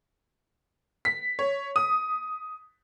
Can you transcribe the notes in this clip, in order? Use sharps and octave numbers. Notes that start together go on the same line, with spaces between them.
B6
C#5
D#6